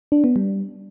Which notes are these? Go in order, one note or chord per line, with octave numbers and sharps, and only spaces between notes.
D4
B3
G3